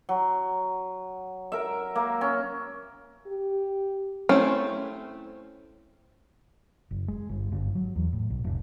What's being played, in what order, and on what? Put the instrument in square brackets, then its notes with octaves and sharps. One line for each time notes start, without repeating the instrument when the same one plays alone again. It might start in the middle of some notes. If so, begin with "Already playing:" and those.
[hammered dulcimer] F#3
A#4 E5
A#3
C#4
[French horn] G4
[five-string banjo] A3 C4 C#4 E4
[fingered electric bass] F#1
G#3
G1
G1
F#3
E2
A2
B1
F1